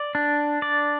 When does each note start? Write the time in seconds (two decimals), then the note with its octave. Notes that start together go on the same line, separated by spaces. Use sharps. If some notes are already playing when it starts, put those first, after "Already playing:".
Already playing: D5
0.15 D4
0.62 D5